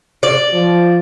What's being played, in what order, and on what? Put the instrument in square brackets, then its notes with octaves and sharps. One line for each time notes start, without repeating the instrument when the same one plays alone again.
[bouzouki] D5
[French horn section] F3